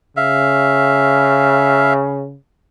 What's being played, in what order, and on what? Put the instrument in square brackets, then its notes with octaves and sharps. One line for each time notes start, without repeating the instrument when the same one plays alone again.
[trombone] C#3 [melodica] E5 F5